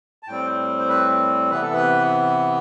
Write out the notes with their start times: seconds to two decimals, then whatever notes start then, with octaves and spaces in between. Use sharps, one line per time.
0.23 A5
0.27 A2 G3 C4 G5
0.79 C5
0.89 B4
1.50 C3 E3 B3 B4
1.62 A4
1.73 B4